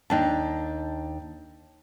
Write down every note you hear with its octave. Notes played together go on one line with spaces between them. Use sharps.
D#2 D4 D#4 G5 A5